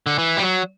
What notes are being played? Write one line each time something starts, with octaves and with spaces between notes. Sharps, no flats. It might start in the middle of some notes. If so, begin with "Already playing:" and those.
D3
E3
G3
F#3